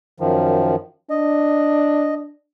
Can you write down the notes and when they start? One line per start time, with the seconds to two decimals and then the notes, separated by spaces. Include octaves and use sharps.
0.20 F#2 D#3 F3
1.10 D4 D#5